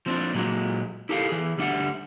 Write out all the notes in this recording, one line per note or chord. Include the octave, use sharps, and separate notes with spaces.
F3 C4 D4
A#2 F#3 G#3
E4 G4 A4 A#4 F5
E3 G#4
D2 G3 D4 E5 F#5